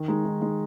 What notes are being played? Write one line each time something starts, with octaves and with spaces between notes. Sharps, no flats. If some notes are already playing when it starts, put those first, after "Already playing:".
Already playing: D#3
G#3 D#4
D#3
G#3 D#4